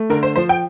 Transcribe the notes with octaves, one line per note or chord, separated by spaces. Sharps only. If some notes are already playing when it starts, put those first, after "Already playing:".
Already playing: A3
D3 A#4
C5
F3 C5
G5